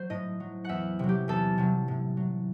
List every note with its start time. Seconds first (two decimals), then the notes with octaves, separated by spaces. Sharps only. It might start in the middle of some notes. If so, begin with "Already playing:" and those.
Already playing: F#3 C5
0.10 A2 D#5
0.40 F#3
0.65 E2 E5 F#5
0.99 C3 F#3
1.09 G4
1.28 E2 A4
1.58 C3 F#3
1.88 A2
2.17 F#3